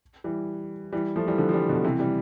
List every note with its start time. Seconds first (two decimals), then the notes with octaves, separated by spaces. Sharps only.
0.24 E3 G3
0.92 E3 G3
1.16 F3 A3
1.28 E3 G3
1.38 D3 F3
1.49 F3
1.53 E3 G3
1.69 B2 D3
1.84 C3 E3
1.99 E3 G3